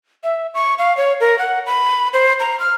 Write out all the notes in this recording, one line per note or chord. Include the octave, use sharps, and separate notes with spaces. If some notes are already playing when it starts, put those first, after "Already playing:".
E5
C#6
F5
C#5
A#4
F#5
B5
C5
A#5
F6